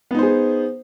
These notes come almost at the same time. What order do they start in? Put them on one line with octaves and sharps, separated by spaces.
B3 D#4 C5 G#4